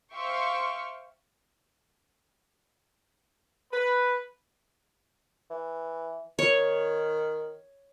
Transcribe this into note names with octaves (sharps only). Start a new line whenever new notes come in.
C5 E5 F5 G5 C6 C#6
B4
E3
D#3 C#5